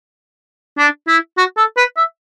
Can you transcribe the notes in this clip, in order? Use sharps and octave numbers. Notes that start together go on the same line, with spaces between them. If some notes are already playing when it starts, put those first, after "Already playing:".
D4
E4
F#4
A4
B4
E5